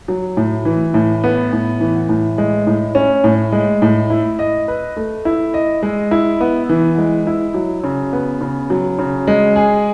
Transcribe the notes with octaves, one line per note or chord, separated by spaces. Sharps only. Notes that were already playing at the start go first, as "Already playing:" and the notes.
F#3
A2
E3
A2
B3
A2
E3
A2
G#3
A2
C#4
A2
G#3
A2
E4
D#5
B4
A3
E4
D#5
G#3
E4
B3
E3
G#3
E4
F#3
C#3
B3
C#3
F#3
C#3
G#3
G#4